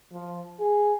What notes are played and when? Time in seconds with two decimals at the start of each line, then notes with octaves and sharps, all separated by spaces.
0.13 F3
0.60 G#4